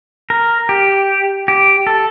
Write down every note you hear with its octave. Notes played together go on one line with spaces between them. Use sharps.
A#4
G4
G4
A4